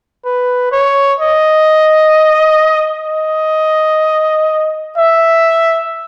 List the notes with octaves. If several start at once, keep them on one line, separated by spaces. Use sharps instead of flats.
B4
C#5
D#5
D#5
E5